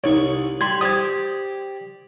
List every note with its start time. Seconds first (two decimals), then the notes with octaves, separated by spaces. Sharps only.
0.04 C2 D#4 C#5 C#6
0.61 G3 C6 G#6
0.81 G4 C5 D5 D#6 G#6